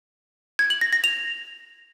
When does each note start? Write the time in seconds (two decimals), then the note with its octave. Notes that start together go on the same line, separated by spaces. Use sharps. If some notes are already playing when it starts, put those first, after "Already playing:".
0.59 G#6
0.70 F#7
0.81 A#6
0.93 A#6
1.04 F7